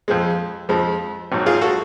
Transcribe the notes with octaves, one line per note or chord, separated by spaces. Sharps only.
F2 F3 G#3
F2 F3 G#3
G#1 G#2 F#3
F4 G#4
F#4 A4